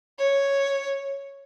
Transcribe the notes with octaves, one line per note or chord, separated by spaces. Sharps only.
C#5